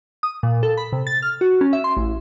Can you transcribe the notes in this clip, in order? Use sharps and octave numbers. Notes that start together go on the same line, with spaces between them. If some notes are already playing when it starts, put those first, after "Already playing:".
D#6
A#2
A4
B5
C3
A6
F6
F#4
C#4
E5
C6
A1